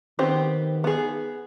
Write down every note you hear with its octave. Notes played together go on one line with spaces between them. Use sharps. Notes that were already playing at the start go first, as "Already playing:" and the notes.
D#3 B3 C4 G4
B3 G#4